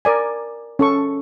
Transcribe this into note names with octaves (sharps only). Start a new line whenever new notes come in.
A#4 D5 G#5
C#4 A4 C#6